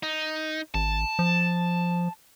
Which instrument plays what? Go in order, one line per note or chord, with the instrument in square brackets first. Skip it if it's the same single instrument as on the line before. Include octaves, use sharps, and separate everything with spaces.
[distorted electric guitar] D#4
[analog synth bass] G#1 [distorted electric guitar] A5
[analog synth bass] F3